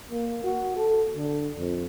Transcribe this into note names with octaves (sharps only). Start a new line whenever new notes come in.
A#3
F#4
A4
D3
F2